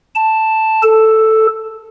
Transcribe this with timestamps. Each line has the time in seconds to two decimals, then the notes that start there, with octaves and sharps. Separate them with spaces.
0.15 A5
0.83 A4